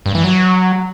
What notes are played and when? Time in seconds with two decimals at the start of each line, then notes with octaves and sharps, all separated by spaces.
0.06 G2
0.15 E3
0.24 F#3